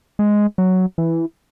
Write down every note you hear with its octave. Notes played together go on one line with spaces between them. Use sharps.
G#3
F#3
E3